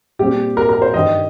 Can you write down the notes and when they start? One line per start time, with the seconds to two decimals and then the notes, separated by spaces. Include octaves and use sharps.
0.19 A#2 G3 C4 G4
0.57 A#4
0.69 A#4
0.82 C5
0.94 G2 D#3 G3 D#5